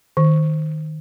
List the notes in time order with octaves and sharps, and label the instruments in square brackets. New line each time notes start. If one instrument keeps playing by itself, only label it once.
[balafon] D#3